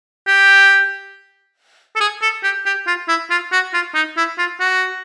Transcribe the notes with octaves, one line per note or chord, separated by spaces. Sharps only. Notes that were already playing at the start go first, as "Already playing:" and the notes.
G4
A4
G#4
A4
G4
G4
F4
E4
F4
F#4
F4
D#4
E4
F4
F#4